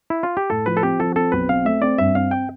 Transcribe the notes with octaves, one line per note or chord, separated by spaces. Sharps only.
E4
F4
G4
A2 A4
F3 B4
A4
C4 G4
F3 A4
C4 A4
B1 B4
C4 F5
A3 E5
C4 D5
G2 E5
C4 F5
G5